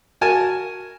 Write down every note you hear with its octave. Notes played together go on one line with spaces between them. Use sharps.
F#4 A#4 G#5 A5